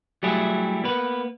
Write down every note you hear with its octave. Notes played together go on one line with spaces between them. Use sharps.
F#3 G3 A3 E4 G4 G#4
A#3 B3 B4